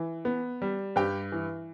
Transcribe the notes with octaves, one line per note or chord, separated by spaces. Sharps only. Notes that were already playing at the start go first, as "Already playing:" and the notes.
Already playing: E3
B3
G3
G2 G4 G5
E3